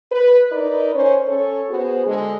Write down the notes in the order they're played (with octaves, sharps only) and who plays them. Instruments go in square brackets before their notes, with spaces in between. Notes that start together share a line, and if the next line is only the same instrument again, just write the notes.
[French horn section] B4
D#4 A#4 B4 D5
C#4 C5 C#5
C#4 A4 C#5
B3 F#4 G#4 C5
D3 G#3